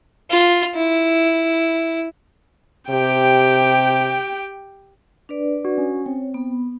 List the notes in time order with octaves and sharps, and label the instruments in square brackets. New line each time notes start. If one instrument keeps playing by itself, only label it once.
[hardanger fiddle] F4
E4
[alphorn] C3 [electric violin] G4 G5
[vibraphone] D4 B4 D5
[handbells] F#4
C#4
[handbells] C4 [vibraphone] C#5
[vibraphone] B3 B5